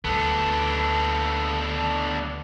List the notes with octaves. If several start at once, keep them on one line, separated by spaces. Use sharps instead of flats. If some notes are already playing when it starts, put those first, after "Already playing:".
D2 B3 D4 A4